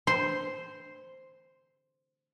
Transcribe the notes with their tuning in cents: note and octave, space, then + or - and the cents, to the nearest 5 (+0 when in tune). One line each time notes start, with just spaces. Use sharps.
C5 +0 C6 +0